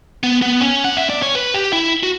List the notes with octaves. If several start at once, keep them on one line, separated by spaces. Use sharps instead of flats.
B3
B3
C#4
F#5
E5
D5
C#5
B4
G4
E4
F#4